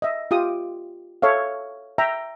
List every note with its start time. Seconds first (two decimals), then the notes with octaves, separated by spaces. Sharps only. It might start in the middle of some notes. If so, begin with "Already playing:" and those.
0.02 D#5 E5
0.31 F4 G4 D#6
1.22 A4 C#5 E5 F5
1.98 E5 G5 A#5